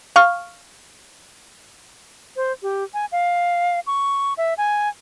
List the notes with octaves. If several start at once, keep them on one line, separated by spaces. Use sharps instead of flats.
F5 C#6 F6
C5
G4
G#5
F5
C#6
E5
G#5